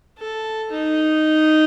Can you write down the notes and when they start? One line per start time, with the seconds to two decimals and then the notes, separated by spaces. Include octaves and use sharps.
0.18 A4
0.72 D#4